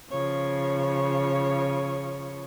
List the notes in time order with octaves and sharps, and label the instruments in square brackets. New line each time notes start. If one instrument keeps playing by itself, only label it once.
[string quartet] C#3 F3 C#5